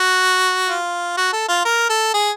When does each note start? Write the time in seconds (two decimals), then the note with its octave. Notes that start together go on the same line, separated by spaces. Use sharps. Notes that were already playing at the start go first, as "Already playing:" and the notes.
Already playing: F#4
0.68 F4
1.17 F#4
1.33 A4
1.49 F4
1.66 A#4
1.90 A4
2.14 G#4